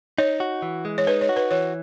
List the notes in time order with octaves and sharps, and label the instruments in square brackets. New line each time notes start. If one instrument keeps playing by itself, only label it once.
[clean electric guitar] D#4 [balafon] C#5
[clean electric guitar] F#4
E3
G#3
[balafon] C#5
[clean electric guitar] D#4 [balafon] B4
[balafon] C#5
[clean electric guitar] F#4
[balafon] B4
[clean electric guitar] E3 [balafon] C#5